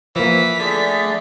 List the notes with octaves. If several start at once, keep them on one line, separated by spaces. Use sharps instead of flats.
E3 F3 A#3 B6
D3 A3 G#4 D5